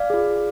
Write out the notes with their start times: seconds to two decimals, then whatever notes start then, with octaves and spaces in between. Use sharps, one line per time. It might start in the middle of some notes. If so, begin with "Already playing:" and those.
Already playing: D5 F5
0.10 F4 G#4